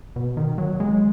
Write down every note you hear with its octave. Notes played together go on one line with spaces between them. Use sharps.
B2
D#3
F#3
G#3